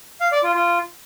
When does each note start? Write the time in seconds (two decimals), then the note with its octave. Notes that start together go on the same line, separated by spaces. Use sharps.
0.21 F5
0.32 D5
0.43 F4
0.54 F4